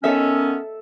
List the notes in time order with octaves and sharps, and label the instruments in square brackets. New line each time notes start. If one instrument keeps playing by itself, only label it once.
[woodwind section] D#3 B3 C#4 [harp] A4 E5